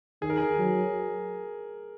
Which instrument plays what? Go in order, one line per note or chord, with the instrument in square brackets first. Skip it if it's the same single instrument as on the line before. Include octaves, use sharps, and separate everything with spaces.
[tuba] D#3 [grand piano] G#4
[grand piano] A#4
G#4
[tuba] F#3